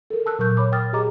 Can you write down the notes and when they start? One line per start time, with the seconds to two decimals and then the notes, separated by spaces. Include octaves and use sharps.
0.10 A4 A#4
0.26 A5 E6 F#6
0.39 A#2 F#3 A#4 C#6 F#6 G6
0.57 C#5 B5 D6
0.72 A#4 G5 D6 D#6 F6 A6
0.93 G4 G#4 D#5 A#5 D6